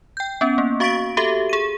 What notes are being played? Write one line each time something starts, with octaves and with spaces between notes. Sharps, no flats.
G5 G6
B3 C#4
A#3
F#4 F5 C#6 A6 B6 D7
F#4 G4 A4 E5
G#4 D#7